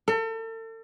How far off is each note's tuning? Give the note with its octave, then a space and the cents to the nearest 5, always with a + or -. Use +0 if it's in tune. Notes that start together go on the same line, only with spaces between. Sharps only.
A4 +40